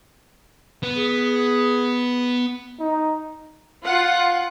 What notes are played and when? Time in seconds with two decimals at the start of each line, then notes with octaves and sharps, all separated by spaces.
0.83 B3
0.96 G#4
2.80 D#4
3.84 F4 F#5